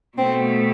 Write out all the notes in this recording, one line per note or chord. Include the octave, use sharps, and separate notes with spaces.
B2 A3 C4